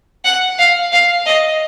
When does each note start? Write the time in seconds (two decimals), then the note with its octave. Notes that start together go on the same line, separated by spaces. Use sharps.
0.25 F#5
0.59 F5
0.92 F5
1.26 D#5